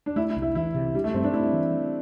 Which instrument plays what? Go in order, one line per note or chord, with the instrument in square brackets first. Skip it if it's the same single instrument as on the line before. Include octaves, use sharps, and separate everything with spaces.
[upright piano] D4
[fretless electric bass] A3 [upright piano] E4
[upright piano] E4
[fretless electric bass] C2
[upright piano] E4
[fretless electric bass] E3 [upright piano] E4
[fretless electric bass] C3
[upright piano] G3 [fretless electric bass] D4
[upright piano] A3
[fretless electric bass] G2 [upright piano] C4
[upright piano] D4
[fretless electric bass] A3 [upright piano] E4
[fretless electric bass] E3
A3